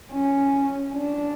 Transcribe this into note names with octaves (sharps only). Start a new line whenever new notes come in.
C#4
D4